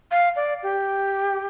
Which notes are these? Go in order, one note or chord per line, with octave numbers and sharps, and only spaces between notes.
F5
D5
G4